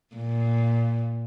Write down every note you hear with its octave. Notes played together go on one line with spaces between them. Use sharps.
A#2